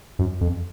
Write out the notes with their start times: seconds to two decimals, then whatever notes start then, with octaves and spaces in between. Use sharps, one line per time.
0.19 F#2
0.41 F2